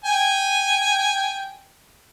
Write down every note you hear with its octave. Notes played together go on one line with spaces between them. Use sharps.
G5 G#5